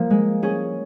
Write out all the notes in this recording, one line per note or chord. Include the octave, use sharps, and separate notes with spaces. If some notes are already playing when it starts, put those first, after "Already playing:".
Already playing: F3 A#3
G#3
C#4 G#4